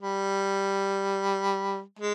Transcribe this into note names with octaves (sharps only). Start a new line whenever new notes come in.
G3
G#3